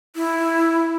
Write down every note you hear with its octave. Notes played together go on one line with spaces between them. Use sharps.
E4